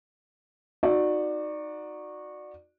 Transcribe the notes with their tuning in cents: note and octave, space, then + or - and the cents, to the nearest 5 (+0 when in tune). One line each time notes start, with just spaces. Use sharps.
D#4 +0 F#4 -15 D5 +15